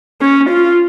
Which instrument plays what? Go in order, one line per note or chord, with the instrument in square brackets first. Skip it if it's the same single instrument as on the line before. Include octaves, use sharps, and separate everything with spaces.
[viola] C#4
F4